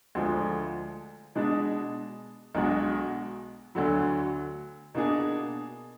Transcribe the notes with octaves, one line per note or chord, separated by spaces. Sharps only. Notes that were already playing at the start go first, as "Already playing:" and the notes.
D2 D3 F3 G#3 D4
B2 G#3 D4 G#4
B1 B2 G#3 D4 F#4
D2 D3 F#3
B2 A#3 D4 G#4